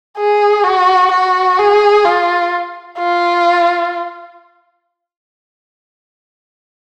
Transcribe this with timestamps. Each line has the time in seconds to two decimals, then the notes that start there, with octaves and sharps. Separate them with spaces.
0.18 G#4
0.64 F#4
1.11 F#4
1.59 G#4
2.05 F4
2.99 F4